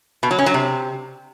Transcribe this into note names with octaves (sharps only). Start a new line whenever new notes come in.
B2
F#3
C#4
F#3
C3